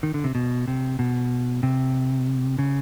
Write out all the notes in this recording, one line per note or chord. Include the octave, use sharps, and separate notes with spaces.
D#3
D3
C3
B2
C3
B2
C3
C#3